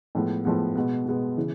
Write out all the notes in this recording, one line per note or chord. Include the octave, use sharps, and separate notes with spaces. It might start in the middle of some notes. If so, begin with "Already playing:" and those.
A2 F3 G#3 B3
A2 F3 G#3 B3
B2 G#3 B3
B2 G#3 B3
C#3 E3